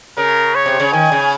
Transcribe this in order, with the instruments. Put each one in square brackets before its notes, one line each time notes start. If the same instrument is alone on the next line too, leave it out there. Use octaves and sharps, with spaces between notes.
[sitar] C#3 [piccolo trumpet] A#4
[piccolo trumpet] C#5
[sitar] C3
C#3
[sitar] D#3 [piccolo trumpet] G#5
[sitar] C#3